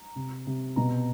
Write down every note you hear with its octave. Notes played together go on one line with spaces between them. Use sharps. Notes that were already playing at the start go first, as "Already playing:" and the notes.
Already playing: A#5
C3
C3
B2 A#5